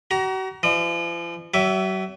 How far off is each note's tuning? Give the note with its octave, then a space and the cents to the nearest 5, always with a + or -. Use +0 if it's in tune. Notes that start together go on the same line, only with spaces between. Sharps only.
F#4 +40 A#5 +20
F3 -45 D#5 -40
F#3 +40 E5 +0 D6 -30